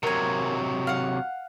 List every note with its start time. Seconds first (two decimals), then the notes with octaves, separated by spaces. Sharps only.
0.03 C3 F#3 A#4 G#5
0.87 F5 F#5